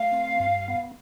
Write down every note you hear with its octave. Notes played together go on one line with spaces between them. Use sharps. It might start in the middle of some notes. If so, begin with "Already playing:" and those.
Already playing: A3 F5
C4
G2
B3